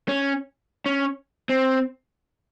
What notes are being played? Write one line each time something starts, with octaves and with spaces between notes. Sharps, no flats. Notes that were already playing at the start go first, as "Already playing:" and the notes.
C#4
C#4
C4